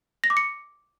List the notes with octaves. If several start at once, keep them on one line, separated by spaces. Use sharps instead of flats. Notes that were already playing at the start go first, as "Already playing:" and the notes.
A#6
D6
C#7